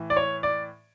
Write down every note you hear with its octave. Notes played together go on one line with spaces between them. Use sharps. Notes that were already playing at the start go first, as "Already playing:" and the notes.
Already playing: A2 E3
D5
C#5
D5